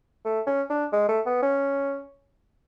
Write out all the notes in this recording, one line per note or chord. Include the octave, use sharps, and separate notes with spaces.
A3
C#4
D4
G#3
A3
B3
C#4